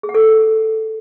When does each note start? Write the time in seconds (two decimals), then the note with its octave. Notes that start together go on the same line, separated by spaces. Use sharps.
0.03 G#4
0.09 F#5
0.14 A4